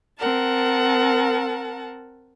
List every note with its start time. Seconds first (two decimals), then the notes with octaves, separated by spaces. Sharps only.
0.18 C4 A#4 F#5 A5